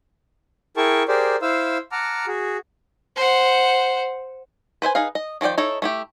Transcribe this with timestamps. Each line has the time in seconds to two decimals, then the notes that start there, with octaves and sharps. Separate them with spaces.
0.77 E4 G#4 A#4 G5 A5 C#6
1.08 G4 G#4 A#4 C5 D5
1.42 E4 C5 F5 E6
1.92 F#5 A5 A#5 D6 F6
2.27 F#4 G#4
3.16 C5 F#5
4.82 B4 C5 E5 G#5
4.95 D#4 G#4 B4 F5
5.15 D#5
5.41 D#3 F3 C#4 D5 G5
5.58 D#4 E4 A4 C#5
5.82 A3 E4 G4